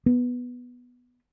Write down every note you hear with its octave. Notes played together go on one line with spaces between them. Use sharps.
B3